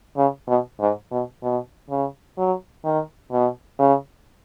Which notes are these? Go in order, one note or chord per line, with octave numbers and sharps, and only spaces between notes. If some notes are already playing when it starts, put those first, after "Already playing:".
C#3
B2
G#2
B2
B2
C#3
F#3
D#3
B2
C#3